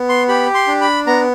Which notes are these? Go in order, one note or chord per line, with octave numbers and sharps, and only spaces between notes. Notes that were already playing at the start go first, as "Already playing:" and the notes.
Already playing: B3
C6
G4 B5
C6
D4
B5
B3 A#5